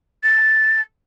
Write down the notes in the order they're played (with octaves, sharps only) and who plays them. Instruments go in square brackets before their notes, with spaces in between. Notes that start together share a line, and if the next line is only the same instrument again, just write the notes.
[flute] A6